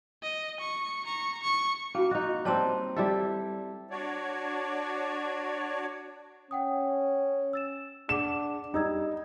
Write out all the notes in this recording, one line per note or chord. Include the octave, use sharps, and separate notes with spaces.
D#5
C#6
A#5 C#6
C#6
A#3 C#4 E4 F#4
D#4 F#4 D#5
G3 C4 C#5 A5 E6
G3 E4 A4
D4 F#4 C#5 D5
C#4 F#5 G5 D#6
E6 A6 E7
D4 G#4 F#5 D6 E7
G3 D#4 D#6 E6 G#6